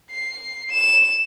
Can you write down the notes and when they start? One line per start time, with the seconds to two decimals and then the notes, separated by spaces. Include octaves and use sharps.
0.11 C7
0.70 E7